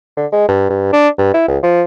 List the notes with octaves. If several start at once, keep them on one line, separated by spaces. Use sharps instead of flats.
D3
G#3
G2
G2
D4
G2
E4
C#2
F3